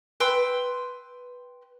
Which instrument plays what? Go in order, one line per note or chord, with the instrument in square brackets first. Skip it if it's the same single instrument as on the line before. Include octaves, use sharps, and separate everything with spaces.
[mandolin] B4 G5 C6 E6